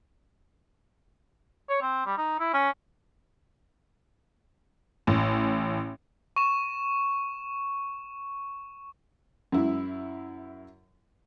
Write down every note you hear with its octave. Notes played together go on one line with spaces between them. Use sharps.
C#5
C4
G3
D#4
E4
C#4
A1
C#6 E7
F#2 E4